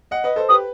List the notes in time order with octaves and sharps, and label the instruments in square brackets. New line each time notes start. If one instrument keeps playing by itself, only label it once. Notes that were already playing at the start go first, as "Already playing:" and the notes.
[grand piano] D#5 F#5
B4 D#5
A4 C5
[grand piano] G4 B4 [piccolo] D#6